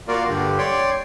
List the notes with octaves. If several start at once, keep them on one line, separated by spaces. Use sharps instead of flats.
A#3 F4 F#4 A#4 D5
G2 D3 G4
C#5 D5 G5 C6